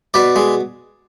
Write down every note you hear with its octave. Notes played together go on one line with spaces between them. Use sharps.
B2 B4 D5
G#3